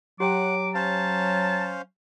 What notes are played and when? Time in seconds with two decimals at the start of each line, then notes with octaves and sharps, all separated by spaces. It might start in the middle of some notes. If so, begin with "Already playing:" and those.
0.20 F#3 G4 C#5 F#5 G5 D6
0.75 C#4 C5 F5 A5